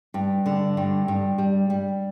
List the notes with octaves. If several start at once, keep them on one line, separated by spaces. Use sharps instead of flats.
G2
D3
G2
G2
G3
G3